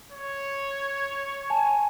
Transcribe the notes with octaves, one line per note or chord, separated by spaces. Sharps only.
C#5
G#5 A5